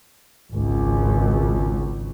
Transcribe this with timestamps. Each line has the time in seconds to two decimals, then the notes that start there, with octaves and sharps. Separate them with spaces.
0.52 G#1 C#2